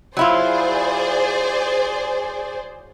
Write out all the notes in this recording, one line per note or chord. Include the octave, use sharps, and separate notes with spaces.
F#3 E4 F4 G#4 C5 D5